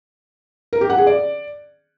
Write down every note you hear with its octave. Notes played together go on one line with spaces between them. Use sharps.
A#4
G4
F#5
G#4
D5